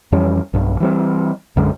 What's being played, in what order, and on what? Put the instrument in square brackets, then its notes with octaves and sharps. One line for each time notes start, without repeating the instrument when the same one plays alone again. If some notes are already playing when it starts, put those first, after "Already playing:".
[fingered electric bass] F2 E3 G3 C#4
B1 G2
E3 G3 C4
B1 F#2 D3 G#3